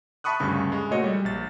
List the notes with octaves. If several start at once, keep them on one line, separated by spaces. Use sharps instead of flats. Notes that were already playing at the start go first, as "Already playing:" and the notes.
E5 A5 B5 C#6 D#6 F#6
D2 G2 C#3 C#6
G#3
A#2 A3 F#4 C#5 D#5 C#7
G3
A#1 A6